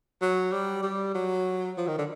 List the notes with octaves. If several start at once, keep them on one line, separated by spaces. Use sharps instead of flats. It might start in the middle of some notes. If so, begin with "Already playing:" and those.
F#3
G3
G3
F#3
F3
D#3
D3